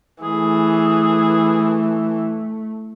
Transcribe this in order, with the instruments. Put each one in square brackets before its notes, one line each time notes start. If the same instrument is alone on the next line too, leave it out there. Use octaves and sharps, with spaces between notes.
[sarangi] E3 [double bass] A3 [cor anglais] G#4